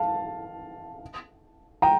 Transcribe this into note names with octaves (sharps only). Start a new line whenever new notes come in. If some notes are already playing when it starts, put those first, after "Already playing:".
Already playing: F5 A5
G5 A#5